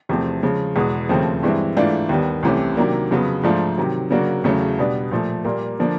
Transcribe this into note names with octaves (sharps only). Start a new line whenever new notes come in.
E2 C3 F3 A3 C4
C#3 F3 G#3
E2 B2 G#3 B3
D#2 C#3 F3 A3 C4
G2 E3 G#3 C4 E4
G#2 E3 A3 D4 F4
D#2 D#3 G3 B3
C2 C3 E3 A3 C#4
C3 D#3 F#3 A#3 D4
F2 C#3 F#3 B3
G#2 F3 A3 D4 F4
C3 D#3 F#3
C#3 F#3 A#3 D4 F#4
E2 C#3 F#3 A3 C#4
B2 G3 B3 D4
A#2 F3 A3
A#2 G3 A#3
D3 F3 A#3 D4